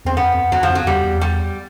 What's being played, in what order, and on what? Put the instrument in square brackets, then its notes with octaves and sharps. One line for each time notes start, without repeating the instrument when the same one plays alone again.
[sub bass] E2 [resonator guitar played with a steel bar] C4
[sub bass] F2 [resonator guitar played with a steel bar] B3
[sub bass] F2
[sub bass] E2 [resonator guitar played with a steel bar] F#3
[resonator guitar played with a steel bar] F3
[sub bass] F2
[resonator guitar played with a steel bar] F#3
[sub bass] E2
[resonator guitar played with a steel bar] G3
[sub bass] E2
[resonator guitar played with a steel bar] G3